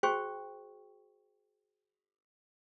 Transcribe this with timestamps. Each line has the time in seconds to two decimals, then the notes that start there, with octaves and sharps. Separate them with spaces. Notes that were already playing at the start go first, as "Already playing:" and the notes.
0.03 F#4 G#4 C5 G5 C#6